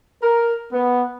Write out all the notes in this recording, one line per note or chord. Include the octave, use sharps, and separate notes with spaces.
A#4
B3